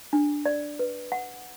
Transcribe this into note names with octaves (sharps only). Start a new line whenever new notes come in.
D4
D5
B4
F#5